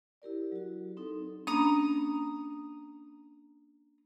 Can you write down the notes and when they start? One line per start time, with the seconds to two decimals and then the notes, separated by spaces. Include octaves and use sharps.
0.22 E4 G4 A#4 D5
0.52 F#3 F#4
0.97 C4 D#4 A4
1.47 A#3 C#4 D4 A#5 D#6